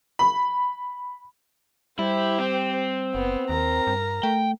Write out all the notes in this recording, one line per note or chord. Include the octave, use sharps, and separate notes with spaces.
B5
G3 E4 G4 C5
C4
F#1 B3
D#2 A#4 A#5
G2
A3 G5